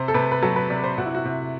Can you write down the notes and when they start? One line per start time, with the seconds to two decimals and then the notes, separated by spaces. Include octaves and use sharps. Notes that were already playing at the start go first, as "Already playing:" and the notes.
Already playing: C3 C5
0.08 A4
0.14 C3 B4
0.32 B4
0.43 F#3 A4
0.56 B4
0.70 C3 D5
0.84 C5
0.98 C3 F#4
1.06 E4
1.15 F#4
1.25 C3